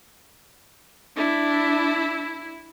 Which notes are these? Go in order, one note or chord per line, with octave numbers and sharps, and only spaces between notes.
D4 E4